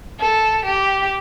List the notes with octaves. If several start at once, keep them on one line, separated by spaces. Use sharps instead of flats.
A4
G4